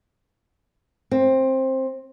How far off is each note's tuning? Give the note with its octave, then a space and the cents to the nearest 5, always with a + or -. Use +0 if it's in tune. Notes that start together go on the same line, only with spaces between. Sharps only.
C4 +15